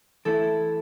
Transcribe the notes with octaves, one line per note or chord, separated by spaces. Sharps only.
E3 A3 E4 A4